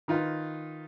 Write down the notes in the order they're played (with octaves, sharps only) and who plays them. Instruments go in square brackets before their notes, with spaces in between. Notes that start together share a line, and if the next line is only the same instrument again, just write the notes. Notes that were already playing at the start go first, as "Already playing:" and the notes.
[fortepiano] D#3 D#4 F4 B4